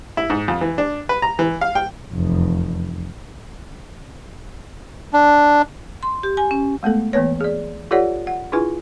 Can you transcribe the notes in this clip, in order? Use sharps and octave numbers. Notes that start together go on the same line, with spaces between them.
E4
G#2
F2
E3
D4
B4
A#5
E3
F5
G5
F1 E2
D4
C6
G4
G#5
C#4
G#3 A3 B3 A4
E3 A#3 B3 B4 C#5
G#4 D5
F4 G4 A4 C#5 D5 F#5
F#5
D4 E4 F4 G#4 B4 G#5